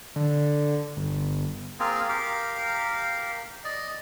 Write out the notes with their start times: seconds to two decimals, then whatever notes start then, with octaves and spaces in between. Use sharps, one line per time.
0.16 D3
0.97 G1
1.80 A#3 C4 F4 G#4
2.09 G4 A#4 F5
3.64 D5 D#5